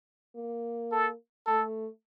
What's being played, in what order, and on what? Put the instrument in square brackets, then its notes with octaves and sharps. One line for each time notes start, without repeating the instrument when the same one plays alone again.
[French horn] A#3
[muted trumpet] A4
[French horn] A3 [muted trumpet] A4